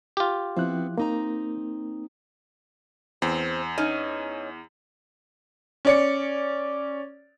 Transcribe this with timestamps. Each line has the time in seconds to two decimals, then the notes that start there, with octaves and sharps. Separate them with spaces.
0.17 F4 G4
0.57 F3 B3 C4 E4 F#6
0.98 A#3 C4 D#4 A#5
3.22 E2 C4
3.78 C#4 D#4
5.85 C#4 D5 C#7